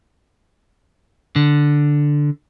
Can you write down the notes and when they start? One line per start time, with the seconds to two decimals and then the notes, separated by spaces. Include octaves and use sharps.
1.36 D3